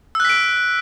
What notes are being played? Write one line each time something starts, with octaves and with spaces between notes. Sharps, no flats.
E6 F#6 B6 D7